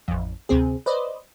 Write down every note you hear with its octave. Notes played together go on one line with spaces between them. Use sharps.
A1 F2
D2 C3 C4 G#4
B4 C5 D5 D#5